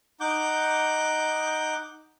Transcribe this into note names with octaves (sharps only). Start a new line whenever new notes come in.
D#4 F#5 D6 G6